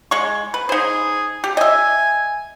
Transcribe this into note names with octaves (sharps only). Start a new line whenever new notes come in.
G#3 C#6
B4
D#4 G#4 C5
G4
D#5 E5 G#5